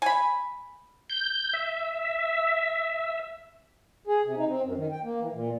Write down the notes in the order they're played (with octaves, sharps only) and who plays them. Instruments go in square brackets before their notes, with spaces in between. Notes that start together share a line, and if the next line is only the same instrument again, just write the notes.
[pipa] G#5 B5
[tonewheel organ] G6
E5
[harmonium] G#4
C3
D#4
C4
F#2
D#3
G5
A#3
E3
A#2